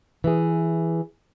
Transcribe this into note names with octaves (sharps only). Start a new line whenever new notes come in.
E3 G#4